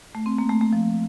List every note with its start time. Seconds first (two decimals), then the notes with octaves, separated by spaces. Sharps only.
0.15 A3
0.26 C4
0.38 A#3
0.49 A3
0.61 A3
0.73 F3